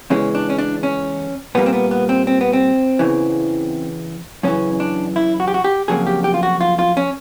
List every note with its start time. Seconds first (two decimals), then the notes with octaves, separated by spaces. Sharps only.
0.10 E2 C#3 E3 G#3 C#4
0.35 D4
0.50 C#4
0.58 D4
0.83 C#4
1.55 A#2 G3 A#3 B3
1.66 C4
1.73 B3
1.91 B3
2.09 C4
2.27 C4
2.41 B3
2.53 C4
2.99 E2 C#3 E3
4.43 F#2 C#3 E3 C#4
4.80 D4
5.16 E4
5.40 F#4
5.48 G4
5.54 F#4
5.64 G4
5.88 F2 C#3 F#3 A#3 G#4
6.07 G4
6.24 G4
6.34 F4
6.43 F#4
6.61 F4
6.79 F4
6.97 C#4